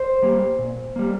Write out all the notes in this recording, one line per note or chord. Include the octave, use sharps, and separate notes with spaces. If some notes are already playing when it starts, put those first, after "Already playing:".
Already playing: C5
G3 A#3
A#2
G3 A#3